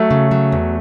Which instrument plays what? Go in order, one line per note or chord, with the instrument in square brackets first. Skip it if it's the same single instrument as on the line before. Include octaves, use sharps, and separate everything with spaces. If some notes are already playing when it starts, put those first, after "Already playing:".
Already playing: [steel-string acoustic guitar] F#3 [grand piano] A3
[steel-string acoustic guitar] C#3
F#3
E2